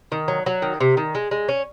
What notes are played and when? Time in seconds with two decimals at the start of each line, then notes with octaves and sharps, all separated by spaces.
0.12 D#3
0.28 F#3
0.46 F#3
0.62 D#3
0.80 C3
0.97 D#3
1.15 G#3
1.31 G#3
1.49 C#4